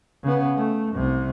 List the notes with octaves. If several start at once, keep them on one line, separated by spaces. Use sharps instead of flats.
C#3 B3
A3
C2 C3